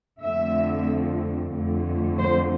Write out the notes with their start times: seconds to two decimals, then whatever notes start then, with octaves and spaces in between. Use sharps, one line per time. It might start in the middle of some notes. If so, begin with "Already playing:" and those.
0.23 F2 D3 F3 A3 C4 E5
1.53 F2 D3 A3
2.19 C5